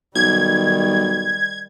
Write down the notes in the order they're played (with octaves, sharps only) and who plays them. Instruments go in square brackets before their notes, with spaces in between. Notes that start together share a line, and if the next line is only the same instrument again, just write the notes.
[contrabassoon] B1 [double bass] D#3 G3 [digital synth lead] G#6